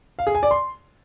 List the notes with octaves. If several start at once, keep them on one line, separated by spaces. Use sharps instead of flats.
F5
G#4
G#5
D5
C6